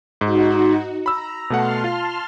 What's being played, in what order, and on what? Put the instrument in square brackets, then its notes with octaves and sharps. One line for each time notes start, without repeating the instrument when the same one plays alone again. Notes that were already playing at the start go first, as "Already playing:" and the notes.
[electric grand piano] G#2 [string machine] D#4 F#4
[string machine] A#5 [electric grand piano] B5 E6
[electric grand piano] B2 A3 F#5 [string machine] A5 C6 F6
[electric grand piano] F4